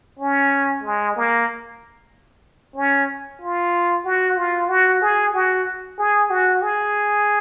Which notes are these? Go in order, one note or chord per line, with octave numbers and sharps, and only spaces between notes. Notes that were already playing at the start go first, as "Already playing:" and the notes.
C#4
G#3
A#3
C#4
F4
F#4
F4
F#4
G#4
F#4
G#4
F#4
G#4